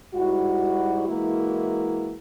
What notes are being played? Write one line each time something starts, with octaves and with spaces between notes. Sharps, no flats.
G#2 G3 E4 F#4
E3 G#3 A#3 E4 F#4 A#4